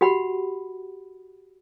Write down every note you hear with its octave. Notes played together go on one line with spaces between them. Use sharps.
F#4 G4 F#5 B5